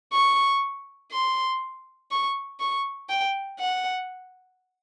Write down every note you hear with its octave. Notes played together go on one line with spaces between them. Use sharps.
C#6
C6
C#6
C#6
G5
F#5